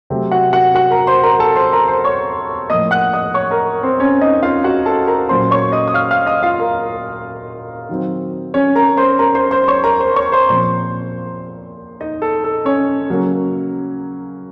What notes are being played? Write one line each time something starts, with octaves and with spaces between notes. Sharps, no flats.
C3 F#3 A3 C4
F#4 F#5
F#4 F#5
F#4 F#5
A#4 A#5
C5 C6
A#4 A#5
A4 A5
C5 C6
A#4 A#5
C5 C6
C#5 C#6
A2 F3 A#3 D#5 D#6
F#5 F#6
D#5 D#6
C#5 C#6
A#4 A#5
C4 C5
C#4 C#5
D#4 D#5
F4 F5
F#4 F#5
A4 A5
A#4 A#5
A#2 F#3 A#3 C#4 C5 C6
C#5 C#6
D#5 D#6
D#6
F5 F6
F5 F6
D#5 D#6
F4 F5
A#4
D#3 F#3 C4
C#4 C#5
A#4 A#5
C5 C6
A#4 A#5
C5 C6
C5 C6
C#5 C#6
A#4 A#5
C5 C6
C#5 C#6
C5 C6
A#2 F3 C4 C5 C6
D#4 D#5
A4
A4
C#4 C#5
C#3 F#3 A#3 C#4